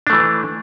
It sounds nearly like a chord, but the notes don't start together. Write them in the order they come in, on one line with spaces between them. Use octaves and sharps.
D4 A3 E3